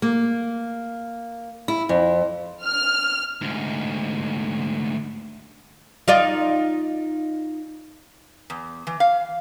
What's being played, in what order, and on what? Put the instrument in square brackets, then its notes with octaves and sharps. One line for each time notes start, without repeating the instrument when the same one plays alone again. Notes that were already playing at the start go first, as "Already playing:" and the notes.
[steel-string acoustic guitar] A#3
E4
F2
[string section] F6
[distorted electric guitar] D2 G#2
[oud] D#4 F4 D5
[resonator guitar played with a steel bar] E2
E3
F5